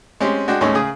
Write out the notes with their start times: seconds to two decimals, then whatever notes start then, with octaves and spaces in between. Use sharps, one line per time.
0.21 G#3 C4 C#4 G4
0.48 G#3 D4 F#4 G5
0.61 D#2 A2 G#3 C#4 C#5
0.74 C#3 G#4 D#6